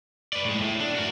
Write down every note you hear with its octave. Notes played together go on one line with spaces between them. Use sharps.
B4 D5
A2 G#3
A2
D4
F#4 A#4